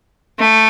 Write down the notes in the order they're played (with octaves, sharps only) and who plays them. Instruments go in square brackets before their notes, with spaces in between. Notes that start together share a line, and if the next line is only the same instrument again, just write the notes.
[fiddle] A3